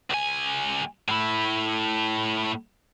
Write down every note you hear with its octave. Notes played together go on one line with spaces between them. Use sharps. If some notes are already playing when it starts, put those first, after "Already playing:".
C#2 G#5
A2 E4